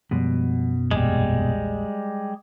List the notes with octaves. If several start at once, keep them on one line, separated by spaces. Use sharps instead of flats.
F#2 B2 F3 G3 G#3
A#1 E2 A#2 G3 G#3